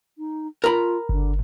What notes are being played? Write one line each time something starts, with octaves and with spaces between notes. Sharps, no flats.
D#4
F4 A#4 A#5 B5
G1 D3